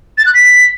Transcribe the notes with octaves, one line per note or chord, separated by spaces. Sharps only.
A6
F#6
B6